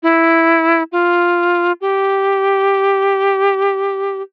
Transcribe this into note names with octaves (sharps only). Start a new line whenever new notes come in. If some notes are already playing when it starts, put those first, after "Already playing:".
E4
F4
G4